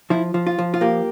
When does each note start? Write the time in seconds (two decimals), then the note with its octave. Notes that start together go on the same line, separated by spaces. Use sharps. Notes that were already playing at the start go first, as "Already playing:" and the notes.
0.10 F3 E4
0.34 F3
0.47 F4
0.59 F3
0.74 F4
0.81 A#3 G4